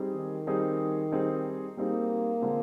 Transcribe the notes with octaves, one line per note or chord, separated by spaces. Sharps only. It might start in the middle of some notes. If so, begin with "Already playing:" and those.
Already playing: G3 C4 D#4 G#4
D#3
G3 C4 D#4 G#4
G3 C4 D#4 G#4
G3 A#3 C4 D#4 G#4
D3 G#3 C4 F4